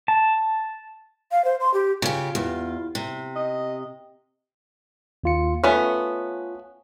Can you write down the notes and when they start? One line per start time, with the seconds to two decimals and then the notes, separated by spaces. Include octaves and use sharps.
0.08 A5
1.31 F5
1.44 C5
1.60 C6
1.74 G4
2.02 C#3 F4 G4
2.35 E2
2.95 C3
3.36 D#5
5.24 D#2 F4 C#7
5.64 A3 B3 C#4 F4